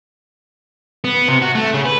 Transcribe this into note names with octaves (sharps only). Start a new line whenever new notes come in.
B3
C3
F#4
A3
C#3
B4